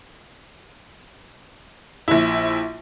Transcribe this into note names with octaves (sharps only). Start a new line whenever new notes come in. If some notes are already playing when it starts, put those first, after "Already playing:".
A#1 E4